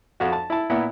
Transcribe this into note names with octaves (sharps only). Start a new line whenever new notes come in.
F2 F#4
A5
E4 A5
A#2 B3 E4